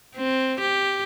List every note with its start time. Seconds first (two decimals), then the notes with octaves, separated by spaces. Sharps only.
0.16 C4
0.61 G4